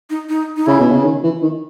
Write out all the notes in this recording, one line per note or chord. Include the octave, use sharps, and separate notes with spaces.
D#4
D#4
D#4
C#3 E4
B2
C#3
D#3
E3
D#3